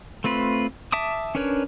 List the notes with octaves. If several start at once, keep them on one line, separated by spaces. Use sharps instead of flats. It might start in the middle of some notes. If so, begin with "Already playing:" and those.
A3 C4 F4 B4
E5 A5 D6 D#6
C#4 D4 A#4 B4 C#5